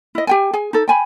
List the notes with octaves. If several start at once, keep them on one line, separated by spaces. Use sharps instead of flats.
E4 D#5
G4 G5 G#5
G#4 G#5
D#4 A4
G5 G#5 B5